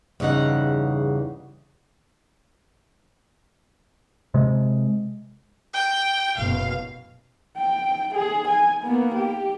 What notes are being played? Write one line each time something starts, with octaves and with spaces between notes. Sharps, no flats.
E2 G2 C#3 D#4 F#5
C3 G#3
G5
F#1 B2 F5
G5
G#4
G#5
A#3 B3
G4